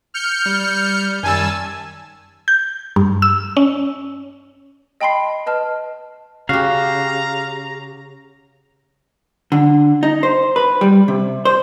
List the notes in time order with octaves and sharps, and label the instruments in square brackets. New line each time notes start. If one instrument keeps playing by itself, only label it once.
[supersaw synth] F6 G6 C#7
[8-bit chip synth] G3
[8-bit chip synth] F#2 D#3 G3 [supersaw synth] G#5 A5 E6
[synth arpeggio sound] G6
G2
E6
C#4
[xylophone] D#5 G5 A5 B5 C6 C7
B4 D#5 A5 F6
[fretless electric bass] C#3 [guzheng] F#4 G4 [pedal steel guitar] F5 [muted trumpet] A#5
[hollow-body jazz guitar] D3
D#4
C5
B4
G3
C3
C5